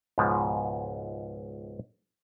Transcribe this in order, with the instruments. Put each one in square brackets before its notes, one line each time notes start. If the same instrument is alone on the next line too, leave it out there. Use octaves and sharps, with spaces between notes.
[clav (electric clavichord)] C#2 G#2 B2 F3 G#3